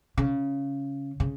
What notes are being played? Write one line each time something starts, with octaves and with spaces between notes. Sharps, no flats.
C#3
C#3